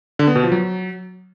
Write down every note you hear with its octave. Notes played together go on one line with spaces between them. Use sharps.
D3
B3
B2
F3
F#3